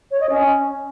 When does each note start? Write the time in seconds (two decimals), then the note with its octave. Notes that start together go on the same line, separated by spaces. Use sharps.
0.11 C#5
0.21 D#5
0.30 C#4